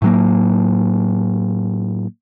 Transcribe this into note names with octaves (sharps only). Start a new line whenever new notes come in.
A2 F#3 A#3